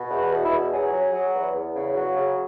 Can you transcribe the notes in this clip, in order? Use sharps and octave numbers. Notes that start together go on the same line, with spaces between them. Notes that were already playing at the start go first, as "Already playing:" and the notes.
Already playing: B2
E2
F#4
B2
E4
E2
F#3 G#4
F#3
F#3
E2
E2
C#3
F#3
C#3